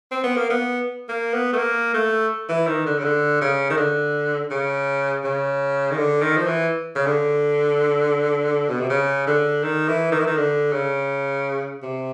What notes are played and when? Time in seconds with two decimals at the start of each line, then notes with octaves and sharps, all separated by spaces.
0.11 C4
0.24 B3
0.37 A#3
0.50 B3
1.09 A#3
1.33 B3
1.53 A3
1.57 A#3
1.94 A3
2.49 E3
2.67 D#3
2.86 D3
2.99 C#3
3.04 D3
3.41 C#3
3.70 D#3
3.77 D3
4.51 C#3
5.24 C#3
5.91 D#3
5.97 D3
6.22 D#3
6.36 F3
6.46 E3
6.95 C#3
7.07 D3
8.69 B2
8.80 C3
8.89 C#3
9.27 D3
9.63 D#3
9.88 E3
10.12 D#3
10.20 E3
10.27 D#3
10.37 D3
10.72 C#3
11.82 C3